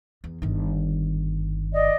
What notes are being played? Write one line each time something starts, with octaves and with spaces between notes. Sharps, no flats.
E2
G1 D#3
D5 D#5